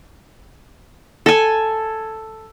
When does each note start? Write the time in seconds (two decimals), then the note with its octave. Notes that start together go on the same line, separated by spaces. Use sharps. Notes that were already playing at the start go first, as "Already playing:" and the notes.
1.26 A4 G#5